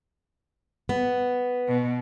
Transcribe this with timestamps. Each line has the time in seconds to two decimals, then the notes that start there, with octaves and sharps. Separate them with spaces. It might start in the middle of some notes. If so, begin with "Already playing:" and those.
0.89 B3
1.68 B2